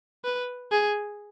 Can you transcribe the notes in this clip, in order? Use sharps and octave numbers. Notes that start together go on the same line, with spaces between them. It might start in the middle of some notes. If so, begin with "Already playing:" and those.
B4
G#4